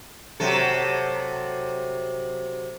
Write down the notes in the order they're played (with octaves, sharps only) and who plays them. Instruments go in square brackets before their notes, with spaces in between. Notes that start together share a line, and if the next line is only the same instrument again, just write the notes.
[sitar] C3 F#3 A4